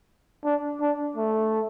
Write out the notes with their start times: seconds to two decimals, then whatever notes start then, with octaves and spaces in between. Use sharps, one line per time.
0.45 D4
0.81 D4
1.16 A3